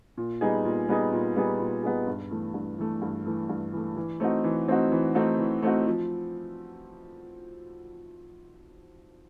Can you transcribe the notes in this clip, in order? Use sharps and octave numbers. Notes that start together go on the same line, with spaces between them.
A#2
G3 B3 D#4 G#4
A#2
G3 B3 D#4 G#4
A#2
G3 B3 D#4 G#4
A#2
G3 B3 D#4 G#4
G2
E3 A3
G2
E3 A3
G2
E3 A3
G2
E3 A3
E3
A3 C4 D#4 F#4
E3
A3 C4 D#4 F#4
E3
A3 C4 D#4 F#4
E3
A3 C4 D#4 F#4
F3